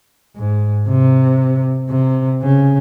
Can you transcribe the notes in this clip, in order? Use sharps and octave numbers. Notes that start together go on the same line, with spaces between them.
G#2
C3
C3
C#3